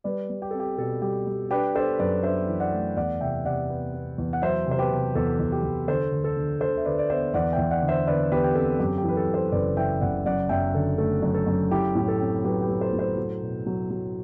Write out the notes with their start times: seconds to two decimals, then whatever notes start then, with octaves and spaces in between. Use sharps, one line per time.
0.04 G3 B4 D5
0.30 G3
0.42 G4
0.51 C4 A4
0.60 G4
0.78 B2 A4
1.02 G3 G4
1.27 G3
1.51 D4 G4 B4
1.75 D4 A4 C5
1.99 F#2 B4 D5
2.23 D4 C5 E5
2.48 E3
2.60 D5 F#5
2.72 A3
2.96 E2 D5 F#5
3.20 C3 E5 G5
3.44 C3 D5 F#5
3.69 B3
3.94 B3
4.18 E2
4.33 F#5
4.42 F#3 C5 E5
4.67 C3 C5
4.79 G4 B4
4.92 C3
5.15 E2 A4
5.39 E2
5.52 G4
5.63 E2
5.88 D3 A4 C5
6.12 D2
6.24 A4
6.37 D3
6.60 D2 A4 C5
6.77 E5
6.85 D3 B4 D5
6.99 D5
7.10 B3 C5 E5
7.34 E2 D5 F#5
7.52 E5 G5
7.58 E2
7.71 D5 F#5
7.82 D3
7.88 C5 E5
8.07 D3 B4 D5
8.32 E2 G4 B4
8.44 G4
8.55 C4 A4
8.79 F#2 G4
8.98 G4
9.04 E3
9.09 B4
9.17 A4
9.28 F#2
9.34 A4 C5
9.52 F#1 B4 D5
9.77 E3 E5 G5
10.01 F#1 D5 F#5
10.26 F#2 D5 F#5
10.49 F#2 E5 G5
10.74 D3 A4
10.98 A3 A4
11.22 F#2
11.34 A4
11.47 F#2
11.71 E4 G4
11.95 A2
12.08 A4
12.20 C4
12.44 F#3 G4 B4
12.62 G4 B4
12.69 F#3
12.81 A4 C5
12.92 A2
12.98 A4 C5
13.18 F#3
13.41 B2
13.66 F#3
13.90 F#3